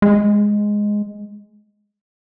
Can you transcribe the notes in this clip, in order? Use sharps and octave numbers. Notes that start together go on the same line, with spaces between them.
G#3